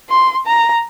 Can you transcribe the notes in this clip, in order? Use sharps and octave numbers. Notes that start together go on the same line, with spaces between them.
C6
A#5